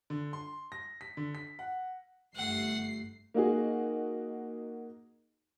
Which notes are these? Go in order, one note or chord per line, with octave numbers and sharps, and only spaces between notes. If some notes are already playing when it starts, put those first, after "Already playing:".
D3
C6
A#6
B6
D3
B6
F#5
G1 A3 F#5 C7
A#3 D#4 F#4 G#4